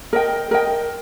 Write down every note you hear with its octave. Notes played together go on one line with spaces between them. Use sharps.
A#4 D#5 G5
A#4 D#5 G5